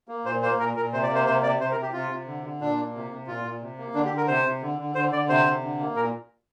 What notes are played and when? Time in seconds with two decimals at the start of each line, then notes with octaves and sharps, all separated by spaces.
0.09 A#3
0.25 A#2 C5
0.42 A#3 C5
0.59 A#2 A#4
0.75 A#2 A#4
0.93 C3 C5
1.03 D5
1.09 A#3
1.15 C5
1.26 C3 C5
1.43 C3 D5
1.59 C3 C5
1.71 A#4
1.77 C3
1.82 G4
1.93 C3 F4
2.10 C3
2.27 D3
2.44 D3
2.60 A#2 D4
2.77 A#3
2.95 C3
3.11 C3
3.27 A#2 F4
3.44 A#2
3.61 C3
3.78 A#3
3.94 D3 D4
4.05 G4
4.12 D3
4.17 A#4
4.28 C3 C5
4.45 C3
4.62 D3
4.78 D3
4.95 D3 C5
5.12 D3 D5
5.29 C3 C5
5.45 C3
5.62 D3
5.80 A#3
5.96 A#2 A#4